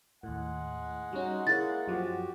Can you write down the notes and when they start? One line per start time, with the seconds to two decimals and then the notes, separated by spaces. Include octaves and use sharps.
0.23 D#2 A2 G#3 F#5
1.13 G3 C#4 D#4 F#4
1.47 A#3 E4 G#4 C#5 A6
1.88 F#2 F3 F#4 G4